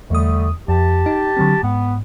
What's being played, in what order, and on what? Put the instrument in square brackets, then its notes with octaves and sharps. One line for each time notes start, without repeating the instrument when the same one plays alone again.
[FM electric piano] E2 D#6 [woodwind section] D3 G3 A3
[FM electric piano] F2 [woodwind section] G4 A5
[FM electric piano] D#4
D3 F#3 C4
[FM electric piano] G#2 [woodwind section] B3